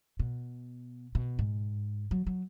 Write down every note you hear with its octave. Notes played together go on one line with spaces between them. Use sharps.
B2
B2
G#2
F#3
F#3